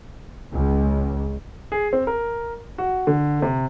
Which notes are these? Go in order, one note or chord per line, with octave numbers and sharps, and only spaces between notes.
C#2
G#4
C4
A#4
F#4
D3
C3